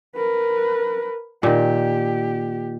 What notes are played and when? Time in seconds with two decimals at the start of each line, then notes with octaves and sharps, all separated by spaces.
0.16 A#4 B4
1.43 A#2 D#3 G4